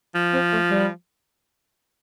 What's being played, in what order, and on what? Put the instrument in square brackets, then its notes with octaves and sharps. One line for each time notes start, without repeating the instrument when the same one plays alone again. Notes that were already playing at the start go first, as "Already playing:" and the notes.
[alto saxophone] F3
[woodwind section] C4
A3
G3